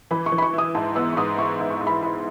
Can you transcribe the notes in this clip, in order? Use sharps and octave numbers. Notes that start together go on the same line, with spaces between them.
E3 B5
C#6
E3
B5
C#6
E4 D#6
G#2 A5
B3 E6
C#6
G#2 D#6
E4 C#6
G#2
C#6
G#2
B5
E4 B5